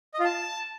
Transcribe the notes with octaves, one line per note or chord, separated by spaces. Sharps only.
D#5
F4
A5